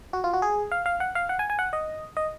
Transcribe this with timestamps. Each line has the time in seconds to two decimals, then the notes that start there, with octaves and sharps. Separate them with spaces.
0.13 F#4
0.24 F4
0.33 F#4
0.42 G#4
0.71 F5
0.86 F5
1.00 F#5
1.15 F5
1.29 F#5
1.39 G#5
1.50 G#5
1.59 F#5
1.73 D#5
2.17 D#5